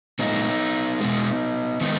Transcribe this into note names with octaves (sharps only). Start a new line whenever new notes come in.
A#2 G#3 B3 D#4
B2 G#3
D#3 G#3 B3 D#4